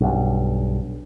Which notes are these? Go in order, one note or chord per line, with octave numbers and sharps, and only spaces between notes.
B1 G2